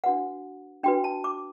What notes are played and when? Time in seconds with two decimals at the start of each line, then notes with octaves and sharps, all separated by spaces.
0.04 D4 F#4 B4 F#5
0.83 D4 F#4 B4 G5
1.04 A5
1.24 D6